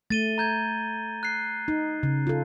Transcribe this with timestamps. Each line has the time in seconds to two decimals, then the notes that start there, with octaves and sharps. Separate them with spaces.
0.10 A3 A6 D#7 G7
0.38 A#5 G6 G#6
1.23 F#6 C7
1.68 D#4
2.03 C#3
2.27 F4 A4